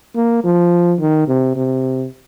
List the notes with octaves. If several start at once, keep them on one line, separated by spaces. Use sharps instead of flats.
A#3
F3
D#3
C3
C3